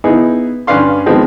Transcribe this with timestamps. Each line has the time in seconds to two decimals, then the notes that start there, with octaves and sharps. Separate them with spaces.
0.04 B3 D#4 E4 G#4
0.67 G2 C#4 B4 D5 F5 C6
1.06 D#3 F3 G#3 B3 C4 G#4